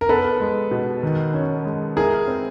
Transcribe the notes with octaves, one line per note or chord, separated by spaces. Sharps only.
A#4
B3 A4 B4
G#3
B2
D#3
C#4
G#3
E4 G#4 A#4
C4